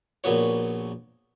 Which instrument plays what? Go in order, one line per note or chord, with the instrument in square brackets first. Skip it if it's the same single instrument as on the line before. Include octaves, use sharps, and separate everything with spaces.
[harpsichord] A#1 A#2 B3 F#4 C#5